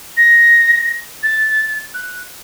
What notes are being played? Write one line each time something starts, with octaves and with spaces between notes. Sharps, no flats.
A#6
A6
F#6